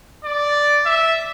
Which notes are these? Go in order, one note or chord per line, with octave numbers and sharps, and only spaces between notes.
D5
E5